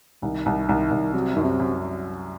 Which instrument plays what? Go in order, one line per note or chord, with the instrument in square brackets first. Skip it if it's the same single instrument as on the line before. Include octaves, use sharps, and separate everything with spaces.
[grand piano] C2 [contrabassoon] D#3
[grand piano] C2
[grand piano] C2 [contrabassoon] D#3
[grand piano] C2
[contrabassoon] C3 [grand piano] F#3
[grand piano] F#2 [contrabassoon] D#3
[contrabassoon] C3
[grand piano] F#2